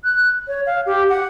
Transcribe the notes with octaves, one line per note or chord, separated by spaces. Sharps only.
F#6
C#5
F5
G4
F#5